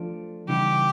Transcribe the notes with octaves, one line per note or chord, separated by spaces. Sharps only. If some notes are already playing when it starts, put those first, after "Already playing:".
Already playing: F3 A3 D4 F4
C#3 E3 G3 B3 D#4 G4